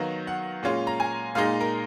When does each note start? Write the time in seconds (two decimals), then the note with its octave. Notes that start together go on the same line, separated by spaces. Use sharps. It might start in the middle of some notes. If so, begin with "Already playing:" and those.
Already playing: D#3 F#3 B3 D#4 F5
0.27 F#5
0.63 A#2 G#3 C#4 F4
0.87 A#5
1.00 G#5
1.35 A#2 G#3 D#4 F5
1.61 A#4